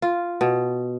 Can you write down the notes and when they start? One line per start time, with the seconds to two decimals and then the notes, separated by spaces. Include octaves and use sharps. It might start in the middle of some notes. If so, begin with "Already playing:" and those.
0.02 F4
0.41 B2